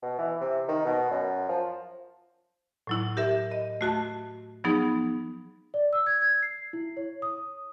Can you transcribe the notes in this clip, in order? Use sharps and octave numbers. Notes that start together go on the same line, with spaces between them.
B2
E3
C3
D#3
B2
F#2
F3
A2 F#3 E4
G4 A#4 E5
D#5
A3 F#4 A5
F3 F#3 B3 D#4 G#4
D5
E6
G#6
G#6
C7
E4
C#5
D#6